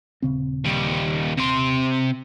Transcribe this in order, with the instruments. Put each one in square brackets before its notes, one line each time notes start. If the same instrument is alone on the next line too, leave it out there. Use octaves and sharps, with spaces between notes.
[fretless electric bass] D#1 C#3 C4
[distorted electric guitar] D#2 G3
C3 C6